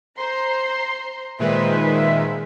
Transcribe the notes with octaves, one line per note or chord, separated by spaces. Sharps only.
C5 A#5 C6
A#2 D#3 G#3 B4 C5 E5